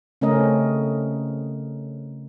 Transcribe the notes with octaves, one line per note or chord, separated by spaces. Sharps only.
C#3 A3 C4 C#4 A#4 D#5